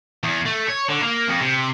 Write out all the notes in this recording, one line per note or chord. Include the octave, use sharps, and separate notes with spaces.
E2
A3
C#5
D3
A#3
F2
C3